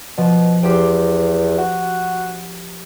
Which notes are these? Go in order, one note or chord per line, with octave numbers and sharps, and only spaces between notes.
B2 F3
E2 G4 C5 G5
F#4